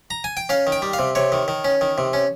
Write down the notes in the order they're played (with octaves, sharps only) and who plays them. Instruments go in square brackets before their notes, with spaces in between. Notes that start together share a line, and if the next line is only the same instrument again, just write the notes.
[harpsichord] A#5
G#5
G5
C#4 F5
D#3
G5
G3
F5
C3
C3 C#5
D#3
D#3
C#4
D#3
C3
C#4